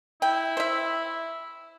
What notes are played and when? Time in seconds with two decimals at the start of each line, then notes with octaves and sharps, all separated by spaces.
0.22 E4 G5
0.57 C5 E5